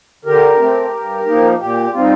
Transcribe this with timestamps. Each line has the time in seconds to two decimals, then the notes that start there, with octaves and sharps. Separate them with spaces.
0.25 D3 G4 A#4
0.59 A3 C4
0.93 G2
1.26 F3 A#3 D#4
1.59 A#2 G4
1.93 G3 C4 D#4 F4